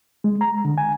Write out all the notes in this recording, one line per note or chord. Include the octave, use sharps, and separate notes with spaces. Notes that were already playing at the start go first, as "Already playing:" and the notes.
G#3
A#5
D3
G#5